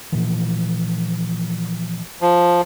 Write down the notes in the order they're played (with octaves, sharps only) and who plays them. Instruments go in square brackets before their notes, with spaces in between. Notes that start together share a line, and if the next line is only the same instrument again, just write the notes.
[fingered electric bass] A#2 E3 F3
[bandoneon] F3